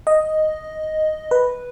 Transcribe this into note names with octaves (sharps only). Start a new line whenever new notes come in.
D#5
B4